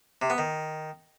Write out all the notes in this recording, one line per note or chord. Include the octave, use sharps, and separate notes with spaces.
C3
B3
D#3